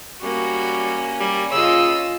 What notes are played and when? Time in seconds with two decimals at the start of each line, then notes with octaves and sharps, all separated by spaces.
0.22 G3 A#3 C#4 F#4
1.20 G3
1.52 C#3 F4 D#5 E6